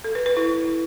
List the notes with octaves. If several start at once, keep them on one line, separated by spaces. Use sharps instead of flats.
A4
B4
B4
E4